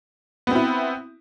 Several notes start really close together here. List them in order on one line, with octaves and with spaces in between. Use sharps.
B3 C4 E4